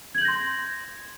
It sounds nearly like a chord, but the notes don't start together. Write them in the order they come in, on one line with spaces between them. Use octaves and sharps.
G#6 F#7 G6 A#6 C6